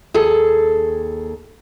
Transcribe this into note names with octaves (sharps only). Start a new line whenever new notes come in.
D#2 G#4 A4 A5